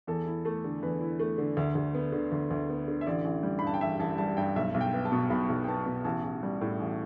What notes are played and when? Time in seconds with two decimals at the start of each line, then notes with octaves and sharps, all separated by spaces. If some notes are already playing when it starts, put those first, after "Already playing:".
0.07 E2 A4
0.26 E4
0.45 A3 A4
0.64 D3
0.82 E2 B4
1.01 E4
1.20 A3
1.38 D3
1.57 D2
1.75 D2
1.95 B3
2.12 D3
2.32 D2
2.51 D2
2.69 B3
2.88 D3
3.01 E5
3.06 A1 D5
3.25 A1
3.43 G3
3.59 B5
3.62 G2 A5
3.74 G5
3.81 A1 E5
3.99 A1 A5
4.18 G3 A5
4.37 G2 G5
4.56 B1 E5
4.74 B1
4.81 G5
4.94 B3
5.05 A5
5.12 B2
5.30 B1 B5
5.49 B1
5.64 G5
5.68 B3 A5
5.86 B2
6.05 A1 A5
6.24 A1
6.43 G3
6.61 A2
6.80 A1